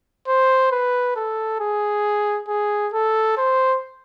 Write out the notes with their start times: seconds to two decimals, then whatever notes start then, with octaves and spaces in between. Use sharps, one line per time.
0.28 C5
0.72 B4
1.16 A4
1.60 G#4
2.48 G#4
2.93 A4
3.37 C5